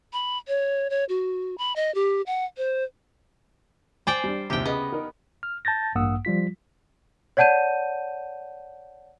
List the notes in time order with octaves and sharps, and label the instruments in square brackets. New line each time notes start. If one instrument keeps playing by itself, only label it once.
[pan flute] B5
C#5
C#5
F#4
B5
D#5
G4
F#5
C5
[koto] C5 D5 G5 [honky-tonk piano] G#5
[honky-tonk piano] G3 D4
[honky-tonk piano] A#1 D#2 C3 [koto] G4 G5
[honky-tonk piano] C#3 D#5 [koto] B3
[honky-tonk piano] D#4 A#4
[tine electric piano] F6
A5 G6 A6 A#6
A1 G2 A#3 F#5 D#6 E6
F3 G3 F4 B6
[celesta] C#5 D5 F#5 A5 G6 D#7